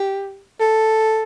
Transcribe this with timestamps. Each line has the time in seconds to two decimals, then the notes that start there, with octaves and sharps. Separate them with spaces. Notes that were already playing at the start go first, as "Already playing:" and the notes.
Already playing: G4
0.60 A4